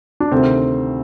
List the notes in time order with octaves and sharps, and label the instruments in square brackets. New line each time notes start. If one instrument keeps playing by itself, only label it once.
[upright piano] D4
D2 C3 D#3 C4